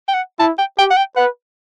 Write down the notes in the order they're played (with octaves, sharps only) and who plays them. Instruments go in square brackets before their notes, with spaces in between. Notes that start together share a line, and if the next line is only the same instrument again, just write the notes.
[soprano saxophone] G5
F#5
[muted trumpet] E4 [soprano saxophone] A5
[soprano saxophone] G5
[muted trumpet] G4 [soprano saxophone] G5
[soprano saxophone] F#5
G5
[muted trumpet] B4 [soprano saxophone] F#5